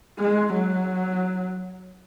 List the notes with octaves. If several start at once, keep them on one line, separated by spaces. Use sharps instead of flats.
G#3
F#3